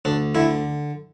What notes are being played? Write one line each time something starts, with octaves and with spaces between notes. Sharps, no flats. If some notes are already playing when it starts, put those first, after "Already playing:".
D2 D4
D3 E4